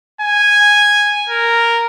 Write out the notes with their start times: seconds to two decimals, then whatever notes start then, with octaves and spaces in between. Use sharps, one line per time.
0.21 G#5
1.29 A#4